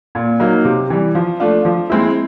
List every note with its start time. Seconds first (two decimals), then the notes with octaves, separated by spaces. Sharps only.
0.15 A#2
0.40 F#3 A#3 D#4
0.65 C3
0.90 E3 G3
1.15 F3
1.40 A3 D4 F4
1.65 F3
1.90 G#3 C4 E4